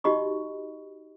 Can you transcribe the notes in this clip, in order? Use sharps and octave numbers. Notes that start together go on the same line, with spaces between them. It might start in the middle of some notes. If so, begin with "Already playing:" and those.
D#4 F#4 G4 D#5 B5 C#6